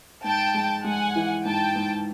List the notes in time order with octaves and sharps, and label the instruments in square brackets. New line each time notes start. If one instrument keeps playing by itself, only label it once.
[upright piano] G#2 [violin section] G5 A5
[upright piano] G#3
[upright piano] G#3 [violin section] F#5 G#5
[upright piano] E3
[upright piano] G#2 [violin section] G5 A5
[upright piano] G#2